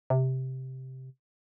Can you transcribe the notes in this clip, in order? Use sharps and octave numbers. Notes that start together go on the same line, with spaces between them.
C3